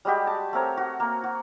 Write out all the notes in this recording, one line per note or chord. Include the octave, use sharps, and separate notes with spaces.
G3 G#3 F#4 G4
A5
A3 C4 A#4 C#5
F#4
A#3
F#4